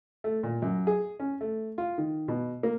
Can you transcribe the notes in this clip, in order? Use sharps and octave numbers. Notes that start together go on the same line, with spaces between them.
A3
A#2
F#2
G#4
C#4
A3
F4
D#3
B2
A#3